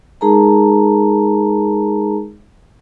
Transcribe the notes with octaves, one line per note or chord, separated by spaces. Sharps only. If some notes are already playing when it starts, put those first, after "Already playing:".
G#3 D#4 G#4 A#4 A5 A#5